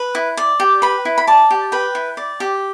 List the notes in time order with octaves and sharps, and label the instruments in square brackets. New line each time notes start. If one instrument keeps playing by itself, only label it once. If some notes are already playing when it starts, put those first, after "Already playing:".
Already playing: [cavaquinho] B4
E4
D5
G4
B4 B5
E4
B5
D5 A5
G4
B4 G5
E4
D5
G4